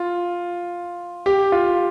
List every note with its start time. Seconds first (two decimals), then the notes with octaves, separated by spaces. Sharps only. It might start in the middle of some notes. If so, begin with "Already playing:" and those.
Already playing: F4
1.26 G4
1.52 F4